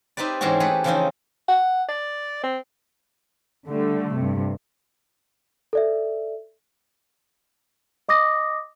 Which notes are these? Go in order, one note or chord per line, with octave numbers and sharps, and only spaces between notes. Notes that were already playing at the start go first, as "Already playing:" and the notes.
C4 D#4 G4 B4 D5
G#2 E3 G#3 C4 C#4 F#4
A3 G4 G#4 B4 F#5
C#3 E3 F3 C4 C#4 D#4
F#5
D5
C4
D3 G3 A3
G2 C3
A4 D5 E5
D#5 D6 D#6 A#6